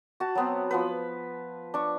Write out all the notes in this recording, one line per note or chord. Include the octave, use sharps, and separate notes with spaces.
F#4 A5
F#3 B3 C4
F3 B3 B4
D4 C#6